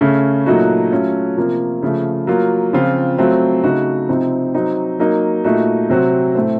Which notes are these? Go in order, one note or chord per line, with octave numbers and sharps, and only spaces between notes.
C#3 A3 C#4
A#2 F#3 A3 D#4 F#4
F#3 A3 C#4 F4
C3 F3 A#3 F4
C#3 F3 A3
F#3 A#3 F4
C#3 F3 C4 F4
F#3 A3 C4 F4
C#3 A3 D#4 F#4
C3 F3 C4 D#4
F#3 C4 D#4
F#3 A#3 D#4
A#2 A3 D#4 F#4
C3 F#3 C4 F#4
A2 A3 C4